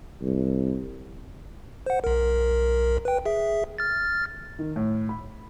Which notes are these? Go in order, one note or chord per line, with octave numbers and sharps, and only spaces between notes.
C2
C5 F#5
B1 A#4
B4 G5
G#4 E5
F6 A6
D#3
A2
B5